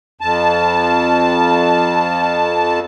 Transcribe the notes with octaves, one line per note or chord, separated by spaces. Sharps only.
F2 A5